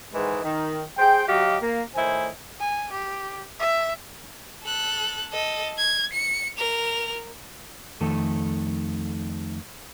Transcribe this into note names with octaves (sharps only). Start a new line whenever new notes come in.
G#2 D#3 E3 G#3
D#3
G#4 C5 G5
F#3 F#4 G4 D#5 F5
A#3
A2 D#3 E4 C5 G#5
G#5
G4
E5
A4 F#6
A4 D#5
G#6
C#7
A#4 F7
F2 D#3 A3 A4